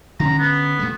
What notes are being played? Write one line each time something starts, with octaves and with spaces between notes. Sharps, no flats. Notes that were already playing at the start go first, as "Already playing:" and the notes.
D3 C#4 A#5
B3
A#2 G3 A3